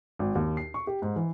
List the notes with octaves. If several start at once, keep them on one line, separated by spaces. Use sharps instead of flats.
G#1
D#2
C7
C#6
G4
G#2
E3